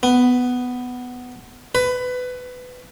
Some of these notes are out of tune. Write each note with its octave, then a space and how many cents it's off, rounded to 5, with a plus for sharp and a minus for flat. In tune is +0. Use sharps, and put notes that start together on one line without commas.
B3 +5
B4 +20